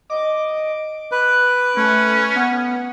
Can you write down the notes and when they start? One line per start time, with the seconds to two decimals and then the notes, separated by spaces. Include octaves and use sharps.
0.10 D#5 D6
1.12 B4 F#6
1.77 A3 C#4
2.36 B3 F#5